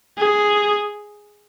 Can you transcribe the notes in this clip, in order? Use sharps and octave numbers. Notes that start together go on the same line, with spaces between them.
G#4